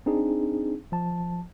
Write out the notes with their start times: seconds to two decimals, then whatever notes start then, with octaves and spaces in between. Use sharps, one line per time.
0.06 C4 D4 D#4 G#4
0.92 F3 A5